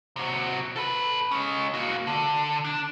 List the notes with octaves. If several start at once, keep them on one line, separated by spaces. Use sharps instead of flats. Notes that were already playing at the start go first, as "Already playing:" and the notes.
C3 F#4
A4 B4
G#3 C#4
A#3 F#4
D3
D4